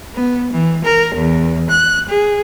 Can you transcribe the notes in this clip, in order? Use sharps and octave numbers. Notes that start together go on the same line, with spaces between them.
B3
E3
A#4
E2
F#6
G#4